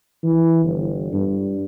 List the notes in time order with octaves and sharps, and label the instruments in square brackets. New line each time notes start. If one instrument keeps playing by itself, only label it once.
[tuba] E3
G1
G2